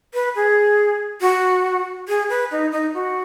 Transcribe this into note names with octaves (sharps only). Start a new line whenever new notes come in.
B4
G#4
F#4
G#4
B4
D#4
D#4
F#4